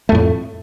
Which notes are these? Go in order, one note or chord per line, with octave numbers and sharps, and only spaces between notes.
F2 A2 A3